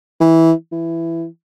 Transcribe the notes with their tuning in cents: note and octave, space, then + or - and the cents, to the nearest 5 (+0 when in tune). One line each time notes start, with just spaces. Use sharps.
E3 -15
E3 +10